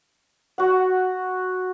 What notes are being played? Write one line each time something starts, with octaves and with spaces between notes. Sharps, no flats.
F#4 F#5